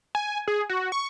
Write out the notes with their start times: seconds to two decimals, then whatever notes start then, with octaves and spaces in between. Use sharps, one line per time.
0.15 G#5
0.48 G#4
0.69 F#4
0.92 C#6